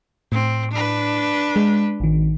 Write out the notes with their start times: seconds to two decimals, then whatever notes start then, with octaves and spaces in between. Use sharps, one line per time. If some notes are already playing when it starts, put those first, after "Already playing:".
0.32 A2 C4
0.72 D4 B4
1.56 G#3
2.00 A1 D#3